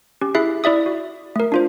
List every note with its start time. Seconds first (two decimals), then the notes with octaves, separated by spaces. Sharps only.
0.21 C#4 G4
0.34 E4 G#4 E5 F#6 C7
0.64 E4 D5 E5 D#6
0.86 F#4
1.36 A3 A#4
1.52 D4 F4 C5